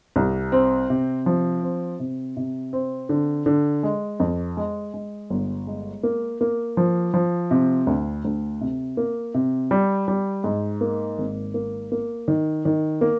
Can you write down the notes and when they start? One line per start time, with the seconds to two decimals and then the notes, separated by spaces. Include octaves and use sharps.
0.16 C2
0.52 C4
0.90 C3
1.26 F3
1.63 C4
2.00 C3
2.37 C3
2.73 C4
3.09 D3
3.46 D3
3.83 G#3
4.20 F2
4.57 G#3
4.94 G#3
5.30 G1
5.67 G#3
6.03 A#3
6.41 A#3
6.77 F3
7.14 F3
7.51 C3
7.87 D2
8.25 D2
8.61 C3
8.97 A#3
9.34 C3
9.71 G3
10.08 G3
10.44 G#2
10.81 A#3
11.18 G#1
11.54 A#3
11.92 A#3
12.28 D#3
12.65 D#3
13.01 A#3